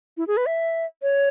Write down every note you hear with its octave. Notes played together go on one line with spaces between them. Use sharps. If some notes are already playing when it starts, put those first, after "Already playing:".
E4
G#4
B4
E5
C#5